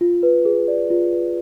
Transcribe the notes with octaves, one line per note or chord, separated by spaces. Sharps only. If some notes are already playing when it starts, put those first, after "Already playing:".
F4
B4
G#4
D5
F4
B4